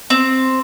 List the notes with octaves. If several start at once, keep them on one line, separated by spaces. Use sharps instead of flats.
C4